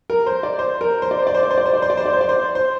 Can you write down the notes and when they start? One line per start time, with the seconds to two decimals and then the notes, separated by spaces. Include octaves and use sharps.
0.10 A#4
0.26 C5
0.43 D5
0.59 C5
0.81 A#4
1.02 C5
1.11 D5
1.19 C5
1.27 D5
1.34 C5
1.43 D5
1.51 C5
1.58 D5
1.66 C5
1.73 D5
1.82 C5
1.90 D5
1.97 C5
2.06 D5
2.13 C5
2.21 D5
2.29 C5
2.55 C5